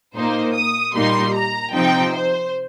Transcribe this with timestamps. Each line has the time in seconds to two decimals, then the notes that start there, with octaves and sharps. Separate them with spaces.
0.16 A#2 A#3 D#4 C5
0.55 D#6
0.95 A#2 G3 A#3 D#4 C6
1.35 A#5
1.74 C3 F3 C4 D#4 G5
2.14 C5